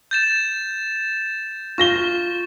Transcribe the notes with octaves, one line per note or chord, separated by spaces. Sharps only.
G6 A6 E7
F4 C#6 A#6 G7